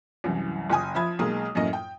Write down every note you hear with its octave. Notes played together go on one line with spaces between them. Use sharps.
C2 F#2 E3
F#1 G5 G#5 D#6
F3 E5 B5 G#6
B1 G#3 A#3 D#6
F#2 A2 A#3 D#5
G5